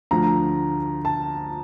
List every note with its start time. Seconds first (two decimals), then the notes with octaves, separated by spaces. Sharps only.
0.11 D2 D3 F3 A#5
1.05 A5